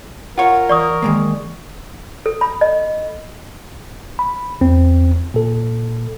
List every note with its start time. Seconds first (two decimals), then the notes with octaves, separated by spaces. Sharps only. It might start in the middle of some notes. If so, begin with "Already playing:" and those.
0.38 F4 A#4 C#5 F#5
0.69 E3 D5 C#6 D#6
1.02 D#3 G#3 A#3
2.26 A4
2.41 B5
2.61 D#5
4.19 B5
4.61 E2 C4
5.34 A#2 A4